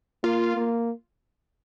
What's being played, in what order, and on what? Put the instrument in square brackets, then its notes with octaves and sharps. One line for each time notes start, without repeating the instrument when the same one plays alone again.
[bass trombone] A#3 [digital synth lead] F4
[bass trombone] A#3